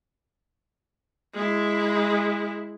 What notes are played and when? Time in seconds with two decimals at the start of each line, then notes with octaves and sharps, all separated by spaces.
1.33 G#3 E4